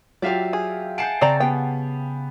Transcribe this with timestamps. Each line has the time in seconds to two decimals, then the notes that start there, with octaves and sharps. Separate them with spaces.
0.22 F#3 F4 G4 D5 E5 F5
0.53 G#4
0.98 F#5 G#5 A5 G6 C7 D7
1.21 C#3 C4 D5 A#5
1.40 B3 G4 G5